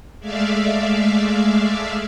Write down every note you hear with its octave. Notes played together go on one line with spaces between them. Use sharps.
G#3 A3 D5 E5 F5